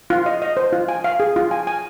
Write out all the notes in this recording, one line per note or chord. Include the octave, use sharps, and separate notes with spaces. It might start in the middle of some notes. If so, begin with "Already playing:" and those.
F4
D#5
D#5
C5
F4
G#5
F5
G#4
F4
G#5
G#5